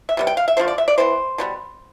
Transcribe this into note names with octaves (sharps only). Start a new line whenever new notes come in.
E5
C3 G3 B3
G5
F5
E5
D3 F3 A3 C5
D5
E5
D5
E3 B3 C5
B2 G3 B3